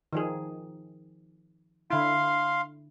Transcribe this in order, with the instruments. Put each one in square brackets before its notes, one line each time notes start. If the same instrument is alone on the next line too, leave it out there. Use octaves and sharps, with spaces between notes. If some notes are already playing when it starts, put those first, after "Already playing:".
[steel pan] D#3 F3 G#4
[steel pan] D3 E4 [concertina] F5 C6